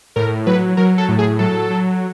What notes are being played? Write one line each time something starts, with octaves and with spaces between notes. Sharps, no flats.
A2 A#4
F#3 B4
F#3 A#4
A4
A2
G#4
F#3 A4
F#3